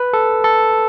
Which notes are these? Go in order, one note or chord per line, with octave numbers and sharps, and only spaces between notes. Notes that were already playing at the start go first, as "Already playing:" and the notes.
Already playing: B4
A4
A4